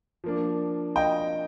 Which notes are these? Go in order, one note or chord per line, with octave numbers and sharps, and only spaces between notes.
F3 A#3 D4
D#5 G5